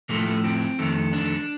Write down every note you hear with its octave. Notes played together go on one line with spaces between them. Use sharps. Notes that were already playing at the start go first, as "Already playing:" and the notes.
A2 F3 A3 A#3
A3
C4
F2 D#3 A3
D4